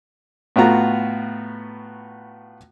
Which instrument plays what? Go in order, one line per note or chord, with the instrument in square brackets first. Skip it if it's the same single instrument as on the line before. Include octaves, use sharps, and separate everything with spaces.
[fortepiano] A2 B3 F4 F#4 A#5